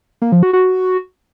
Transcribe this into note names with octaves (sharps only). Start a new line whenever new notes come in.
A#3
F3
F#4
F#4